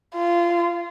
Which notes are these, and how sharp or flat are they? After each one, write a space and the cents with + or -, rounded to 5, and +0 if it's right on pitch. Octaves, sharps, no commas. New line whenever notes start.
F4 -20